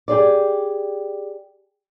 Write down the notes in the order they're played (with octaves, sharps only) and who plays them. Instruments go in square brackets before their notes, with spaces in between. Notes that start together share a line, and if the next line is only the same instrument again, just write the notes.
[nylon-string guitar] G4 G#4 D5